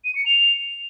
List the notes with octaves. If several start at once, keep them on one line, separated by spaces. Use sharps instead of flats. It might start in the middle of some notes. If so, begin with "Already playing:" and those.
D#7
C#7
F7